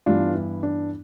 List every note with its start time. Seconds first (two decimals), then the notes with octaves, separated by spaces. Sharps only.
0.06 G2 E3 G3 B3 D4 F4
0.35 E4
0.63 D4